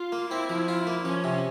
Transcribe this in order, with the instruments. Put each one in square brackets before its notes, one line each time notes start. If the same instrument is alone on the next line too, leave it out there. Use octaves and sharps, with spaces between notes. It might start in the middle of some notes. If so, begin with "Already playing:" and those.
Already playing: [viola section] F4
[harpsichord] A#3
[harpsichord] C4 [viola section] E4
[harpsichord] F3
F4
A#3
[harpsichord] F3 [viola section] C#4
[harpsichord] C3